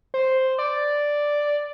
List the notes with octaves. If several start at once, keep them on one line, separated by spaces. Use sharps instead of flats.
C5
D5